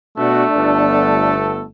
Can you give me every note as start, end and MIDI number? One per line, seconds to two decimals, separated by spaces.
0.17 0.44 47
0.17 1.68 57
0.17 1.36 62
0.17 0.44 66
0.56 1.63 31
0.56 1.63 59
0.56 1.63 69